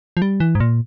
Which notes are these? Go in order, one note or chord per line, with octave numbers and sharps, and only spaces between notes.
F3
G3
E3
G#2
A#2